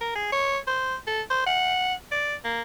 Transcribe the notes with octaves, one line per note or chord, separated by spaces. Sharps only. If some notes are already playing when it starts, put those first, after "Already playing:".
A#4
G#4
C#5
C5
A4
C5
F#5
D5
A#3